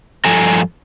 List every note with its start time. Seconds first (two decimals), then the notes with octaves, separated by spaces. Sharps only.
0.25 G2 F3 A4 G#5 A#5